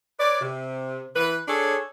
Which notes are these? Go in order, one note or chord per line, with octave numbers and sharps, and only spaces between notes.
B4 C#5 D5
C3
E3 B4
D4 G#4 A4 C#5